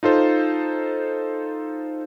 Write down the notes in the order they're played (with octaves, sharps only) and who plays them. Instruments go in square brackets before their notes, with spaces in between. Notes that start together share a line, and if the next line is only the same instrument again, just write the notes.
[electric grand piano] D#4 F4 A4 C5